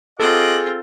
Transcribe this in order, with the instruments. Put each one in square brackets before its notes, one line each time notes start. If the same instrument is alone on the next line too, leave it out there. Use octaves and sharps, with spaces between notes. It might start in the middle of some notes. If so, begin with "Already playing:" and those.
[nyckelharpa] C4 F4 [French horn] G#4 [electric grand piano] A4 [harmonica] D#5 F#5 D6